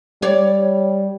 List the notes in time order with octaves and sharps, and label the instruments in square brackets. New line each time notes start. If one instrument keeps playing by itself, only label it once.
[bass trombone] G3 [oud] C#5 D5